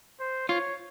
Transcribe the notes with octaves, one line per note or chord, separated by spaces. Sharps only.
C5
F4 C#5